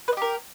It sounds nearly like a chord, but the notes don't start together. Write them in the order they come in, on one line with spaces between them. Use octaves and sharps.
B4 D#5 G4 A#4